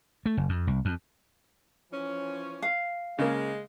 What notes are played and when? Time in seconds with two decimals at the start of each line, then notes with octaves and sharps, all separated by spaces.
0.26 A3
0.37 F#1
0.49 F2
0.67 C2
0.85 F2
1.92 E3 F3 C#4
2.62 F5
3.19 C#3 G#3 A#3